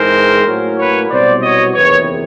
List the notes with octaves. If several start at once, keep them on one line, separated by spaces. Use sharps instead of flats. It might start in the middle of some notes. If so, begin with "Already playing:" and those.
Already playing: G#2 E3 G#3 C4 A#4 C5
A2 F#3 A#3 C#4
B4 C#5
C2 B2 F#3 B3 C5 D5
C#5 D#5
F#1 E2 C3 D#3 B4 C#5